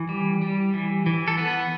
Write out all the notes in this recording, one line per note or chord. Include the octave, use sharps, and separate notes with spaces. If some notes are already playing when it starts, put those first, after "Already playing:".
Already playing: E3
G3
G3
E3
E3
A4
B3 B4